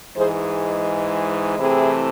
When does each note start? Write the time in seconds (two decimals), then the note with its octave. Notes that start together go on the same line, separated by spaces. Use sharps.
0.16 G#2 E3 G#3 G#4 C5
1.59 C3 E3 A3 C4 E4 G#4